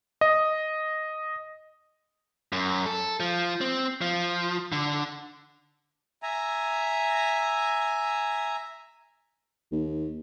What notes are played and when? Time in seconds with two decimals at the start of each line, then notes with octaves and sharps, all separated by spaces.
0.21 D#5
2.52 F#2
2.86 A4
3.20 F3
3.61 C4
4.01 F3
4.72 D3
6.23 E5 G#5 A#5
9.72 D#2